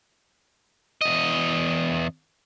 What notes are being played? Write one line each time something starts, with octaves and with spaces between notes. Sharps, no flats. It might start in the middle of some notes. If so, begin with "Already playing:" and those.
E2 D#5